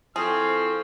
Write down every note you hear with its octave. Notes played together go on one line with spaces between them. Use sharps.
F3 C4 E4 G#4 A4 C#6 F6